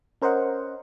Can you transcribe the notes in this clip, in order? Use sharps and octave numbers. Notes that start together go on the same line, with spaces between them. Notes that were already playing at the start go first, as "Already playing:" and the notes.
C#4 A#4 C5 D#5 F#5